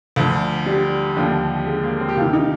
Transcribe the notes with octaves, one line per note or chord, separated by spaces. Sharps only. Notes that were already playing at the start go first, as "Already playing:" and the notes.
D2 D3 F3
G3
D#2 D3 F3
G#3
A#3
C4
G4
D2 C3 D#3 F4
D#4